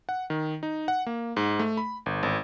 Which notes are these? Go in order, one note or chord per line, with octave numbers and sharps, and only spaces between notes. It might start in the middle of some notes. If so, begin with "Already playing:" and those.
F#5
D#3
D#4
F#5
A#3
G#2
A3
B5
G1
G#1